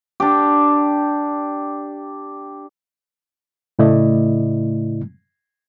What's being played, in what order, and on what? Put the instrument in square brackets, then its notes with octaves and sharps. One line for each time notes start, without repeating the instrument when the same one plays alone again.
[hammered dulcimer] D4 G4
[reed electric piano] A2 C#3 A3 E4 D5 D#5